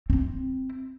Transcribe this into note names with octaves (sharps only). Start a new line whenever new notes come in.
C4 E4